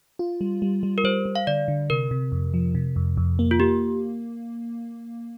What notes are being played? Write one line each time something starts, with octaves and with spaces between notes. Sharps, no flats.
F4
G3
G3
G3
A#4
G3 C5
G3
F5
D3 D5
D3
C3 A#4
C3
F2
F3
C3
F2
F2
A#3
F4
A#3 G4